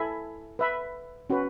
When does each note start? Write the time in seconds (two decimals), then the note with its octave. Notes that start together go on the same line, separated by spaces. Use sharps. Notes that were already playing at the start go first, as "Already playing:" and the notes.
Already playing: E4 A4 E5 G#5 B5
0.59 B4 E5 B5
1.30 C#4 F#4 B4